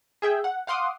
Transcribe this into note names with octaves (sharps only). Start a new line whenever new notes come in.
G#4 E5 G5
F#5
F5 F#5 C6 D6 D#6